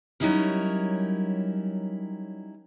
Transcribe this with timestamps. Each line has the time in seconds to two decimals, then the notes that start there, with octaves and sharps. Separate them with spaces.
0.20 F#3 G3 C#4 D#4 E4 A#4